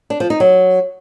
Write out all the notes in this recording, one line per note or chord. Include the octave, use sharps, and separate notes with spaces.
D4
F3
D#4
F#3